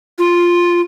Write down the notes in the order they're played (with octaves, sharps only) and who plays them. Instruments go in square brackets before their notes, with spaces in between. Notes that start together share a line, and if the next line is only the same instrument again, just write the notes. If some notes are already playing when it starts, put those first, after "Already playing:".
[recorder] F4